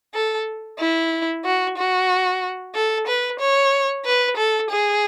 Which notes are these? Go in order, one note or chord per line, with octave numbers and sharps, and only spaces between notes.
A4
E4
F#4
F#4
A4
B4
C#5
B4
A4
G#4